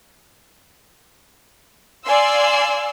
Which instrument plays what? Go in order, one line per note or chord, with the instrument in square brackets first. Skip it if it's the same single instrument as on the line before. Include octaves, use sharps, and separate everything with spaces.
[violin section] D5 F5 G#5 C6 E6